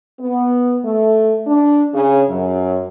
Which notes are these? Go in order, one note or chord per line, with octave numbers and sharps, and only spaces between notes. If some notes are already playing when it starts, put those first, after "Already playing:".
B3
A3
D4
C#3
F#2